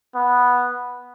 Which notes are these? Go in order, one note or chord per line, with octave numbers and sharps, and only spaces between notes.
B3